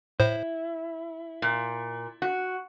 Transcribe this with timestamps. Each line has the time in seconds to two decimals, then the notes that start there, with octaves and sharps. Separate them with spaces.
0.20 A2 E4 C5
1.42 A#2
2.22 F#4